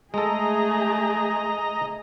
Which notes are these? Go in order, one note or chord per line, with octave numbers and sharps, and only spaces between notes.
G#3 A3 G#4 A4 D#5 A#5